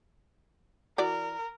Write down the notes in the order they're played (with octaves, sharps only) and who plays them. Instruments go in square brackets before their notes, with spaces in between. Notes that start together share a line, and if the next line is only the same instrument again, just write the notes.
[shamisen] E3 F#4 D5 [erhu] A#4